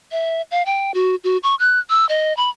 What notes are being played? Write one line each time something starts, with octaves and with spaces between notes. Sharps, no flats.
E5
F5
G5
F#4
F#4
C#6
F#6
E6
D#5
B5